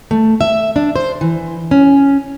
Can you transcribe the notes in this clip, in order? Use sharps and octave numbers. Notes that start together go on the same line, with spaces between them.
A3
E5
D4
C5
E3
C#4